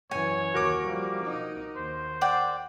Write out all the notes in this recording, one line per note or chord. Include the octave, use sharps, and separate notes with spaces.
F#2 E3 C#5 G#5
D#2 F#4 A#4 D6
F3 G3 A#3
D#4
D#2 C5
D5 F#5 G5